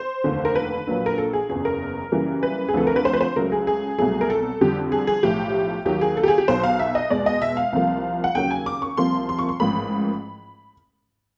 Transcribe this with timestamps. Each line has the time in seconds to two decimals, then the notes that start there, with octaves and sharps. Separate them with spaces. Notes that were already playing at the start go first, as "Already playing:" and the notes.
Already playing: C5
0.24 F1 D#2 D3
0.45 A#4
0.55 B4
0.87 A#1 A#2 F#3
1.06 A#4
1.18 A4
1.33 G#4
1.49 F#1 E2 C#3 G#4
1.65 A#4
2.12 F#2 C#3 E3 G3 A#3
2.43 B4
2.68 G#4
2.74 D2 C3 F3 A4
2.87 A#4
2.96 B4
3.05 C5
3.13 B4
3.21 C5
3.36 C#2 C#3 F#3 A3 A#4
3.52 G#4
3.67 G#4
3.98 C2 B2 F#3 A3 G#4
4.21 A#4
4.30 A4
4.61 F2 D3 G3 G4
4.92 G#4
5.07 G#4
5.23 B1 A2 F3 G4
5.85 D#2 D#3 F#3 G4
6.01 G#4
6.17 A4
6.23 G4
6.28 G#4
6.38 G4
6.48 B1 B2 F#3 C5
6.63 F5
6.79 E5
6.95 D#5
7.10 E2 B2 G#3 D5
7.26 D#5
7.42 E5
7.57 F5
7.73 C2 C3 F3 A#3
8.24 F#5
8.35 D#2 C#3 F#3 A#3 G5
8.51 G#5
8.66 D6
8.82 C#6
8.97 C2 C3 F3 A#3 C6
9.29 C6
9.39 C#6
9.49 C6
9.60 A1 G#2 F3 A#3 B5